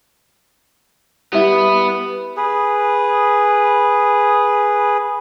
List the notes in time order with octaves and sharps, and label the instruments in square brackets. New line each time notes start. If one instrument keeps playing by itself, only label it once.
[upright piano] G3 E4 [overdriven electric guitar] B3
[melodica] G#4 B4